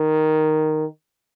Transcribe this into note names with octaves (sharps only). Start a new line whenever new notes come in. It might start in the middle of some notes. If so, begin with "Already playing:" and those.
Already playing: D#3